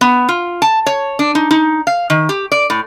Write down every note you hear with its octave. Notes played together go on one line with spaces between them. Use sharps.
B3
F4
A5
C#5
D4
D#4
D#4
F5
D#3
G4
D5
A2